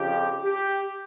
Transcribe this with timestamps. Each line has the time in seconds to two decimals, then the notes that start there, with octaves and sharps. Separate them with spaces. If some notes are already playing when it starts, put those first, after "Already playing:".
Already playing: F2 C#3 F3 G4
0.43 G4